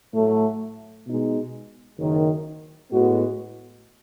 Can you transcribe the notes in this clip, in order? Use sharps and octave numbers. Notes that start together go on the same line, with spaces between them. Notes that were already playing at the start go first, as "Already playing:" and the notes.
A2 F#3 A3
B2 G#3 D#4
F#1 F#2 D#3
A2 G#3 B3 F#4